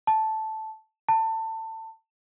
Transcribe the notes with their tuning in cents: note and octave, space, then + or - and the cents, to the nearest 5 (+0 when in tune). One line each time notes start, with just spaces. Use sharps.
A5 -5
A5 +25